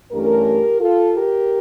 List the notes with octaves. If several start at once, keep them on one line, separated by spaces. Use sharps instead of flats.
G2 E3 A3 C#4 G4 A#4
F4 A4
G4 A#4